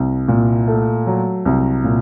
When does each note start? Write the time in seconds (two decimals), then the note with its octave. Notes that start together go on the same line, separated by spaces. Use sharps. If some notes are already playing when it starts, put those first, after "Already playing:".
Already playing: C2
0.28 A#2
0.68 A3
1.07 F#3
1.45 C2
1.84 A#2